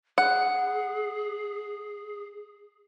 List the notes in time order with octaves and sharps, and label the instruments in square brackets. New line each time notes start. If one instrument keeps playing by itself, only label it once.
[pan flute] G#4 [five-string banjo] F#5